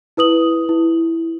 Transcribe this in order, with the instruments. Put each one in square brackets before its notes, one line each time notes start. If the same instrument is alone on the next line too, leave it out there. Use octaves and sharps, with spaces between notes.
[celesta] E4 B4 D#6 F#7
E4